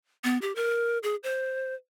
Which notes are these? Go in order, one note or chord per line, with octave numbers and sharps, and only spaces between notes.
B3
G4
A#4
G#4
C5